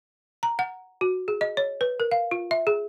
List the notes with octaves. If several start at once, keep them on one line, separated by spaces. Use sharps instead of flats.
A#5
F#5
F#4
G#4
D#5
C#5
B4
A#4
F5
F4
E5
G#4